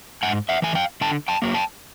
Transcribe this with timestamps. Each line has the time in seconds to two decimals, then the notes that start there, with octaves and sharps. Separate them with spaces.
0.23 G#2 F#5 G#5
0.49 E5 F#5
0.62 E3 A3 G#5
0.75 F5 G5
1.01 D3 G5 A5
1.28 G5 A5
1.42 F#3 A#3
1.54 G5 A5